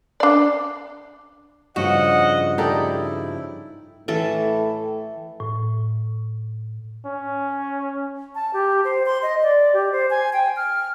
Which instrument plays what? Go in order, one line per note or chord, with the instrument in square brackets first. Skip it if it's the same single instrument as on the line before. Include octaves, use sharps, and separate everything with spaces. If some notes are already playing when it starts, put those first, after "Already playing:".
[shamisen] D4 D5
[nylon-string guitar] G2 C#3 F3 [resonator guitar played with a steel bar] F#4 [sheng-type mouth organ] D#5 F#5
[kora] D#4 A4 [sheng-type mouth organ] E4 [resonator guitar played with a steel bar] G4 D5
[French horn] A2 [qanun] E3 A4
[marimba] A2
[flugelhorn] C#4
[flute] A5
G4
C5
C6
D#5
D5
G4
C5
G#5
G5
F6